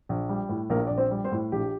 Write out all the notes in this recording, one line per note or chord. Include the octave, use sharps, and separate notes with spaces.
A#1
G3
A2
A#1 A#3 A#4
A#1 D5
C4 C5
G3
C4 C5
A2
A#1 G4